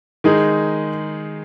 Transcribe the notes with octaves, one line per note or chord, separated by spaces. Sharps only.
D#3 G#3 D#4 G#4